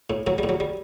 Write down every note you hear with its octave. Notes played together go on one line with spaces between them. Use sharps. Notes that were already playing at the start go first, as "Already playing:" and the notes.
A2
A2 F#3
G3
A2
F#3
G3